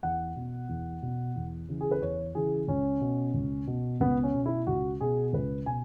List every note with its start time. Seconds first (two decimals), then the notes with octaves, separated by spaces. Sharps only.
0.03 E2 F#5
0.36 B2
0.69 E2
1.02 B2
1.36 E2
1.68 C#3 E3
1.81 G#4
1.91 B4
2.01 E2 C#5
2.35 C#3 E3 G#4
2.68 C#2 C#4
3.01 B2
3.34 C#2
3.67 B2
4.00 C#2 B3
4.23 C#4
4.34 B2
4.46 E4
4.67 C#2 F#4
5.01 B2 G#4
5.33 C#2 B4
5.66 B2 G#5